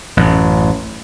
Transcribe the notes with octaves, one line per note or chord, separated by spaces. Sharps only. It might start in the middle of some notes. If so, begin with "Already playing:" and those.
A1 F#2